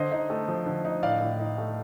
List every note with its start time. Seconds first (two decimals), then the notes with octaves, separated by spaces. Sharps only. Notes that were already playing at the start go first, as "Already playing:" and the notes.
Already playing: D3 C5 D#5
0.12 D#4
0.30 A3
0.48 F3
0.66 D3
0.85 D#4
1.03 A2 D5 F5
1.21 A2
1.39 D#4
1.58 A3